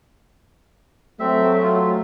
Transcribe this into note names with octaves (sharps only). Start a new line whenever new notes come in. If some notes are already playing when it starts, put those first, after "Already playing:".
F#3 A3 C4 E5
F4